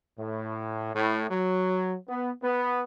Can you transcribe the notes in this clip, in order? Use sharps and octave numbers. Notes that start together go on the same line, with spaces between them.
A2
A2
F#3
B3
B3